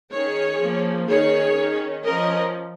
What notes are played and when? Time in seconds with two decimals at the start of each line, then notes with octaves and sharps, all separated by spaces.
0.12 D#3 C#4 G#4 C#5
0.60 F3 A#3 C#4
1.08 D#3 C#4 G#4 C#5
1.55 D#3 C#4
2.04 F3 C#4 A#4 D#5